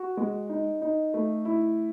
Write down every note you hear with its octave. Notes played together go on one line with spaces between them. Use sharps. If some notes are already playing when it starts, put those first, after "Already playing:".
Already playing: F#4
G#3
D#4
D#4
A3
E4